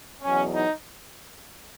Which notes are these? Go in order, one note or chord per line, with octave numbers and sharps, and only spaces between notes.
E2 B2 F#3 C#4
D#4